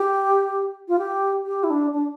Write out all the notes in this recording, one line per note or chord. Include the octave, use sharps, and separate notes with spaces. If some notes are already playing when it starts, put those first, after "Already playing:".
Already playing: G4
F4
G4
G4
E4
D4
D4